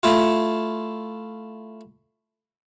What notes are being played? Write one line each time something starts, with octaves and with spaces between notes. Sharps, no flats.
A3 E4 F4